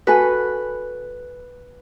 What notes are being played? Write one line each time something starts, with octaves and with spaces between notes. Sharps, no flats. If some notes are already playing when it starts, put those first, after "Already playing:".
F#4 A4 B4 G#5